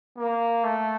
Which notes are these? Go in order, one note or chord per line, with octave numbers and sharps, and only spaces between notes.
A#3
A3